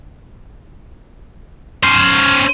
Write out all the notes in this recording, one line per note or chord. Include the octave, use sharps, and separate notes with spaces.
C#4 C5